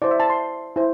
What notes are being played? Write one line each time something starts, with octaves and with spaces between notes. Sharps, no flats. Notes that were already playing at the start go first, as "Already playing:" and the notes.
E4 C5 D5
E5
A5
C6
E4 C5